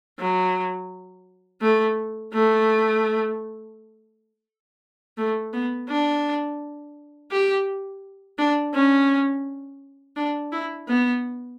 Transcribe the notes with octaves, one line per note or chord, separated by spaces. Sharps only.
F#3
A3
A3
A3
B3
D4
G4
D4
C#4
D4
E4
B3